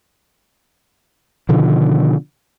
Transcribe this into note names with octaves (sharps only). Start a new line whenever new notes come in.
B2 D3 D#3 F3